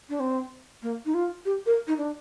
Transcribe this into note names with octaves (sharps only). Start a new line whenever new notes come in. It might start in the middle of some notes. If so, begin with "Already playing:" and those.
D4
C4
A#3
D#4
F4
G4
A#4
D#4
D4